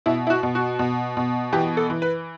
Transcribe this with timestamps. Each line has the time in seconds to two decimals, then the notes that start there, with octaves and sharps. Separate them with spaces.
0.06 B2 E4
0.27 E4
0.30 F#4
0.43 B2
0.55 F#4
0.79 B2
1.17 B2
1.53 E3 G4
1.77 A4
1.90 E3
2.02 B4